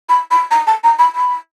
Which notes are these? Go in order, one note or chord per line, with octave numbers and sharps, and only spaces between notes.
B5
B5
A#5
A5
A#5
B5
B5